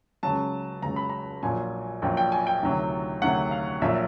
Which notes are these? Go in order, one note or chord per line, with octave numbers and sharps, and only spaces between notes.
C#2 C#3 F#3 A5
C#2 C#3 F#3 A#5
B5
A#5
A#1 A#2 F#3 G#5
A#1 A#2 F#3 G5
G5
G#5
G5
D2 C3 D#3 F#3
D2 C3 D#3 F#3 F#5
F5
A#1 A#2 F#3 E5